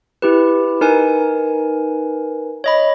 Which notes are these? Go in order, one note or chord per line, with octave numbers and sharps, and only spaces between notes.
E4 G4 B4
D#4 A#4 B4 G#5
C#5 D#5 B5